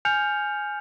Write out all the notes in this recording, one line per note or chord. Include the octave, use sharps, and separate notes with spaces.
G#5 F6 G6 C#7 F7